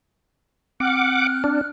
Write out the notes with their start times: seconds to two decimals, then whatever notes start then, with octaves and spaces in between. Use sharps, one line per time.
0.80 C4 F#5 D6 F6 F#6
1.44 D4